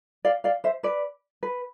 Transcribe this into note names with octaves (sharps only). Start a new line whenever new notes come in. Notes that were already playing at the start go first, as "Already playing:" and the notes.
D5 F5
D5 F5
C5 E5
B4 D5
B4